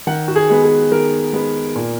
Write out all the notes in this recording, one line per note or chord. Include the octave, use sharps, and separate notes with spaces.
D#3 F#5
F#4
G#4
G#3 B3
G#4
D#3 A#4
G#3 B3
A#2